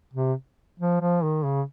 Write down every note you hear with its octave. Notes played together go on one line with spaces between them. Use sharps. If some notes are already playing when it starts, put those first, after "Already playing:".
C3
F3
F3
D#3
C#3